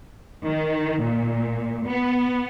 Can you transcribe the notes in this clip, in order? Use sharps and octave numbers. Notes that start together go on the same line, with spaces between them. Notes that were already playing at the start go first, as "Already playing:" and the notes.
D#3
A#2
B3